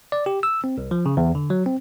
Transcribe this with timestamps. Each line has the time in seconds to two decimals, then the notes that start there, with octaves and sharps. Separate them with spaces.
0.12 D5
0.26 G4
0.43 E6
0.64 C4
0.78 C2
0.91 F3
1.06 C#3
1.17 E2
1.35 D3
1.50 F#3
1.66 C4